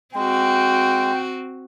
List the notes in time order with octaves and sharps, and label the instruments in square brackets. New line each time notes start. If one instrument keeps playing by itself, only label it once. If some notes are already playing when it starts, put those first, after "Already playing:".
[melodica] G#3 [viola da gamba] C4 F#4 [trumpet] G5